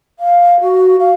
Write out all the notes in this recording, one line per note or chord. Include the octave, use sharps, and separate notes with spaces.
F5
F#4
F5